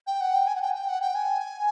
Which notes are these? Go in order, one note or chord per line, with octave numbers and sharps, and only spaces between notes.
G5
F#5
G5
G#5
F#5
G5
G5
F#5
G5
G#5